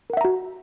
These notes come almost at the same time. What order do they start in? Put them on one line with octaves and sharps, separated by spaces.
A#4 F#5 E5 A#5 F#4